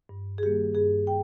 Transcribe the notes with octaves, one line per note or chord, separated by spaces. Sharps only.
G2
G#4
D#3 G3 A#3 G4
G2 G#4
G5